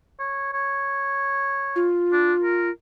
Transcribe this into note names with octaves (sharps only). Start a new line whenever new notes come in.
C#5
C#5
F4
D4
A#4